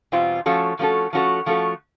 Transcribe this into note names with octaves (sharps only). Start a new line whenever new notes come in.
E2 B2 G3 C4 F4
F3 A3 C#4 F#4 A4
F3 A3 C#4 F#4 A4
F3 A3 C#4 F#4 A4
F3 A3 C#4 F#4 A4